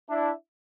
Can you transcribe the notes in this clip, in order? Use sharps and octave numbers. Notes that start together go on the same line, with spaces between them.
D4 E4